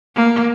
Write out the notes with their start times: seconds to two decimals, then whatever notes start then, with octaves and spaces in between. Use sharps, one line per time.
0.15 A#3